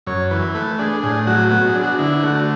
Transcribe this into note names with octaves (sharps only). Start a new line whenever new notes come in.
F#2 C#5
E3 B4
A3 B4
D4 G#4
A2 G#4
F#3 F#4
B3 F#4
G#4
D4
F#4
D3 E4
E4
A3 F#4